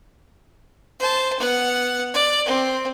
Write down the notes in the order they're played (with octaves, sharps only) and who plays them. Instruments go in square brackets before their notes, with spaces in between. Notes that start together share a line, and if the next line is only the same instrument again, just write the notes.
[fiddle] C5 A5
B3 F#5
D5
C4